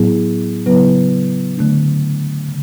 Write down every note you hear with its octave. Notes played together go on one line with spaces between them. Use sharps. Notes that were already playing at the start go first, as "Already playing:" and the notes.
Already playing: A2 F#3 B3 E4 G#4
C#3 F#3 B3 E4 B4
D3 A3 D4
C#3